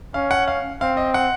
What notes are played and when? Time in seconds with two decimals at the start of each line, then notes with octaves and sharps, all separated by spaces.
0.14 C#4 F5
0.31 F#5
0.48 F5
0.81 C4 F5
0.97 D#5
1.14 F#5